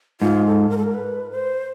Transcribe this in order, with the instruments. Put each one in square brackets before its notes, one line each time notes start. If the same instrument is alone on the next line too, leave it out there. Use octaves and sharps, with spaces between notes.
[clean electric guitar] G#2 [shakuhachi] F4
[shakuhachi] A4
A#4
A4
A#4
B4
C5